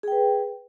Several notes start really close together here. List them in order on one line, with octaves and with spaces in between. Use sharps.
G#4 G5 B4